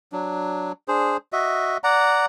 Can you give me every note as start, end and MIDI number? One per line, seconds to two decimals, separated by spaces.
0.12 0.72 54
0.12 0.72 62
0.88 1.17 62
0.88 1.17 68
0.88 1.17 72
1.32 1.77 66
1.32 1.77 75
1.32 1.77 76
1.84 2.26 74
1.84 2.26 78
1.84 2.26 82